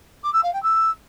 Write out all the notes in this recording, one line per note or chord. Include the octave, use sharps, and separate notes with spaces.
D6
E6
F5
G5
E6